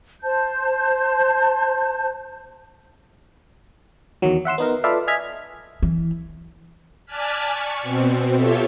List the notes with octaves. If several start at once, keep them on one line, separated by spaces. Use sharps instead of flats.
C5 A5 G6
E2 D#3 F#3
E5 F#5 C6 E6
B3 D#4 A#4
F4 A4 B4 D5 E5 F5
D#5 E5 G#5 F6 G#6 B6
E3
D5 G#5 A5 F6 F#6 B6
C#6
B2 C4
F4 G4 A4 C#5 E5